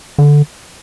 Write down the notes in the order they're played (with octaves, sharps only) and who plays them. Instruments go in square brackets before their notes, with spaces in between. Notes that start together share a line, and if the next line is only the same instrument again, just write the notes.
[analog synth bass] D3